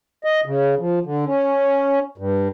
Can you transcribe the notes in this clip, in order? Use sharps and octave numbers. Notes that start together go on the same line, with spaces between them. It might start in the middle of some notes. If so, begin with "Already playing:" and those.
D#5
C#3
F3
D3
C#4
G2